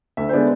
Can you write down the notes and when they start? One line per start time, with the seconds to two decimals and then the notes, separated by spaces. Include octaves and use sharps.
0.17 D2 E5
0.29 C5
0.33 D3 G#3 B3 D5